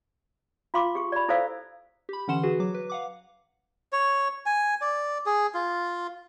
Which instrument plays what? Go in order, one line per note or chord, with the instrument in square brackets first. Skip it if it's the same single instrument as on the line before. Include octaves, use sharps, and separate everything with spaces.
[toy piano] F4 F5 C6 D6
G4 G#4 C#6
D5 B5
E4 A4 C5 D5 F5 E6
[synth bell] G4 B5
D3 E3 C#4 F#5 C6 E7
F#4 G#4 B4
F#3 D6
B4
F5 F#5 D6
[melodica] C#5
G#5
D5
G#4
F4